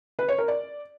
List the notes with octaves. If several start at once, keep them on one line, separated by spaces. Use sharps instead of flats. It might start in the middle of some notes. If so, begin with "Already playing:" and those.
B4
C#5
A#4
D5